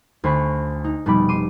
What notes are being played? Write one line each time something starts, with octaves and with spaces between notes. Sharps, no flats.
D2 C5 G#5 B5 C#6
D#4
F1 B2 G3 D#4 B5 D6
C6 D6 D#7